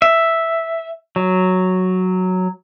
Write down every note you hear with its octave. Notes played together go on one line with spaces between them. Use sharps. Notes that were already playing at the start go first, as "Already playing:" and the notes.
E5
F#3